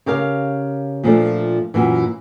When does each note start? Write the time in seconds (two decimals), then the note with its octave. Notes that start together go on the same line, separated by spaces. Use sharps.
0.06 C#3 G4 A#4 F5
1.04 A#2 F3 A3 D4
1.74 F#2 A#2 E3